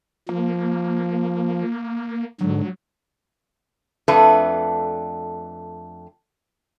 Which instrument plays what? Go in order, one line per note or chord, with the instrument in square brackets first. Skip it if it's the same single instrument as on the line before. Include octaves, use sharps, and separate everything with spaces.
[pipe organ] F3 [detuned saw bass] A#3
[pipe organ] G#2 D3 [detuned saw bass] F#3
[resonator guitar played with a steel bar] F2 A3 D4 B4